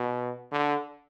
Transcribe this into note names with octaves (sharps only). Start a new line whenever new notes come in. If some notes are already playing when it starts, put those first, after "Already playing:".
Already playing: B2
D3